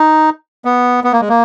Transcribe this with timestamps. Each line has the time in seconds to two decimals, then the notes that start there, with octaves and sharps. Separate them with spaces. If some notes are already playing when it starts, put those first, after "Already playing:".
Already playing: D#4
0.65 B3
1.04 B3
1.12 A#3
1.20 G#3
1.29 A#3